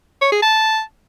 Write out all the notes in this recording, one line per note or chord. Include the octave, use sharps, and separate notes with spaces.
C#5
G#4
A5